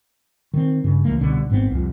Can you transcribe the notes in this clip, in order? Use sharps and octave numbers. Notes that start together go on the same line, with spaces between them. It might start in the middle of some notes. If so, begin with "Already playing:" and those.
D#3 C4
G2 C#3
C#2 E3 A3 A#3
C2 B2 D3 B3
G#1 G#2 B3 C4
C2 F2